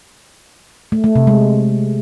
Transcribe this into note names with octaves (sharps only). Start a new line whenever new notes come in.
A3
A3
C3
G#3